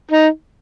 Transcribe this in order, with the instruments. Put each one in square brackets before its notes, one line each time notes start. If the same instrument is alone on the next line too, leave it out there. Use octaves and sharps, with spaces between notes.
[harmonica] D#4